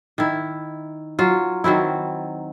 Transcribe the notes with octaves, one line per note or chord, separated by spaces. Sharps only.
D#3 E4
F#3 F4
D#3 F#3 C4 E4